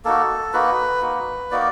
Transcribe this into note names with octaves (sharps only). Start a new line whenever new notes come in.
A#3 D#4 F#4 A4
A#3 D#4 F#4 B4
A#3 D#4 F#4
A#3 D#4 F#4 D5